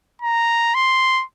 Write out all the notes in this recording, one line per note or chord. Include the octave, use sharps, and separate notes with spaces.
A#5
C6